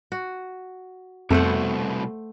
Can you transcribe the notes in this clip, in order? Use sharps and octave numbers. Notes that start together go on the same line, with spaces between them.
F#4
C2 F2 B2 A3 C5 F#5